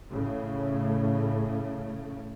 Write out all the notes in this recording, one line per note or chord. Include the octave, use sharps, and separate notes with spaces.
A2 C#3 A3